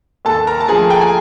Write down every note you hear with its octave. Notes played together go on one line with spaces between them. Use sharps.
D#2 A4 A5
A#4 A#5
A5
D3 F3 A3 G#4 G#5
G5
G#5